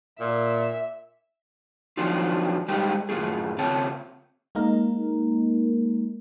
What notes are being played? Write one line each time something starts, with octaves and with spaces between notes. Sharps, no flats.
A#2 E5
F3 F#3 C4 D4 D#4 F4
G3 G#3 D#4 G4 C5
F#2 A2 D#3 G#3 F4 G#4
C#3 C4 F4 C#5 A5
G#3 A#3 D#4 A#4